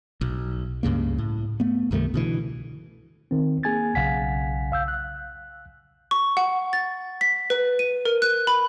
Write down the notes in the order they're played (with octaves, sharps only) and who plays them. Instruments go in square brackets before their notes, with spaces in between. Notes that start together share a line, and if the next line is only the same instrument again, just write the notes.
[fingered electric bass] B1
C#2 G2 C#3 A#3
A2
A3 B3
C2 G2 D#3 A3
B2 D3 E3
[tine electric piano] D#3 C4
A#3 G#4 G#5 G#6 A6
B1 C#3 F5 F#5 G#5 B6
F5 E6 G6
F#6
[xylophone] C#6
F#5
A6
B6
B4
D#7
A#4
F#6
B5